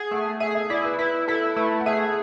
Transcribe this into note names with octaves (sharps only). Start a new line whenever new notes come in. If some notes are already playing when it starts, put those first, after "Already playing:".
Already playing: G#4 F#5
A3 F#5
G#4 E5
E5
E4 D5
B4
E4 B4
E4 A4
A3 B4
F#5
G#4 E5